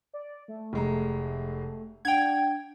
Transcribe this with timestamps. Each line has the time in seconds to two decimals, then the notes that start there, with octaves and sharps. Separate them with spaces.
0.14 D5
0.48 A3
0.73 F1 G#3 A#5
2.05 D4 F#5 G5 G#6 F7